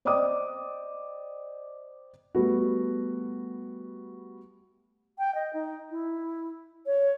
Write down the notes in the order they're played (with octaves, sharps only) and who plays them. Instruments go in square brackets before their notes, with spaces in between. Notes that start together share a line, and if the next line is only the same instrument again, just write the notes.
[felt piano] C5 D5 D#5 G5 D6 D#6
[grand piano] G3 A3 B3 F#4
[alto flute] G5
D#5
D#4
E4
C#5